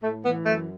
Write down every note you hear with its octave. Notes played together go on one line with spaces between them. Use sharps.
A2 A3
E3 B3
F#2 A3